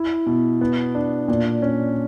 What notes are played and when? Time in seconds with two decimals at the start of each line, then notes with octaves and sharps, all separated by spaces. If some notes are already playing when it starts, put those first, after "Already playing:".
Already playing: E4
0.26 B2
0.61 B3
0.95 D4
1.28 A#2
1.62 C#4